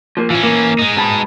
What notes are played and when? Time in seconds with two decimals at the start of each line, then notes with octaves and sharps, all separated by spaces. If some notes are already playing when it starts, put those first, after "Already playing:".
0.17 F3 A#3
0.30 E3 C#4 F4
0.43 A#3
0.79 G#3 D#4
0.97 B2 A5 B5